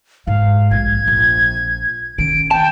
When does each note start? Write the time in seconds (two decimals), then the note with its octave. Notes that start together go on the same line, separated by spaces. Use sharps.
0.27 G#2 G#3 F5
0.71 A#1 G#2 G#6
1.07 A#1
2.18 D#3 C#4 D7
2.51 G5 A5